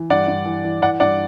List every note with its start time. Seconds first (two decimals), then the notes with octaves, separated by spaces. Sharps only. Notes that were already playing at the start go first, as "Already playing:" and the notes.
Already playing: E3
0.10 G2 D5 F#5
0.28 G2
0.45 E3
0.64 E3
0.82 E3 D5 F#5
1.00 G2 D5 F#5